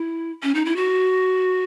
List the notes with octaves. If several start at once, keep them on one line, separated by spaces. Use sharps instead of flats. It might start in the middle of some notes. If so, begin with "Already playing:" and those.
Already playing: E4
C#4
D#4
E4
F#4